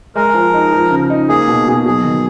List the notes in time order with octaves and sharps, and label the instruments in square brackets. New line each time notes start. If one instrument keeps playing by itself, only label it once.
[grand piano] G#3 [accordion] A#4
[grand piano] F3
D#4
F3
C#3
D#4
[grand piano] A#3 [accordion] G#4
[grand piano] B2
B2
[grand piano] F#3 [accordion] G#4
[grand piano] D#3